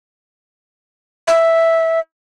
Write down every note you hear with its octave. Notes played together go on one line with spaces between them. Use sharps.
E5